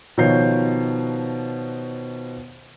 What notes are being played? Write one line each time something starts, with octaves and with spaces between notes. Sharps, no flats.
B2 D#3 F3 C#5 G6 C7